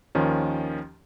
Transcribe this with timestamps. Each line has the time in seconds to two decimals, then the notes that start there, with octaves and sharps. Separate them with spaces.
0.15 D#2 D#3 F3 C#4